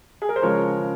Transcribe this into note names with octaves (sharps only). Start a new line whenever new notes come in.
G#4
A#4
C5
C#3 F3 G#3 A#4 C#5
C#3